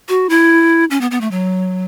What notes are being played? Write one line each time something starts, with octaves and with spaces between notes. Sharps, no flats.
F#4
E4
C#4
B3
B3
A3
F#3